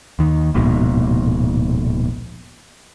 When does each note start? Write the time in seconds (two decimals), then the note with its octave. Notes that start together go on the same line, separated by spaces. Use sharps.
0.19 D#2 D#3
0.54 D1 A#1 G#2 B2